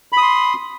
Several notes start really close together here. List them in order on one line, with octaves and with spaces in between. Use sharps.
B5 D#6 C6